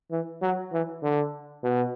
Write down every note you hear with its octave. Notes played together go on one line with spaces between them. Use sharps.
E3
F#3
E3
D3
B2